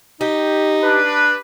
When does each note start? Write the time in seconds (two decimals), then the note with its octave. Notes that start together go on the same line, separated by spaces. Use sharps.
0.21 D#4 G4
0.83 D4 B4